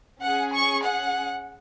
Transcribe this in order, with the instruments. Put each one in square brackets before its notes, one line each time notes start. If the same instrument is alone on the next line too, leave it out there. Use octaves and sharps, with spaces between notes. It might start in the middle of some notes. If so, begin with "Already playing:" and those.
[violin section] C#4 G#4 F#5
C#6
F#5